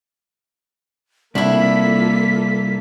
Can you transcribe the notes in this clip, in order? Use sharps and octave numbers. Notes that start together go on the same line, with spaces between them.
C2 A#3 D4 E4 F4 A4 B6